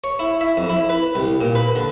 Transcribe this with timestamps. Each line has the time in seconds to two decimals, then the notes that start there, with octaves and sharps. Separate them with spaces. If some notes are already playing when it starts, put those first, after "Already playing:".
0.04 C#5
0.19 E4
0.41 E5
0.57 F2
0.69 E4
0.90 B4
1.15 C2
1.41 A#2
1.55 B4
1.75 D3